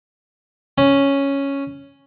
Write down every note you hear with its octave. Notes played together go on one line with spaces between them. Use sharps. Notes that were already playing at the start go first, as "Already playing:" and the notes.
C#4